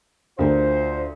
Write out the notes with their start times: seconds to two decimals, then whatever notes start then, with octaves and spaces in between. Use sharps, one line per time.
0.39 D2 F4 A#4 C5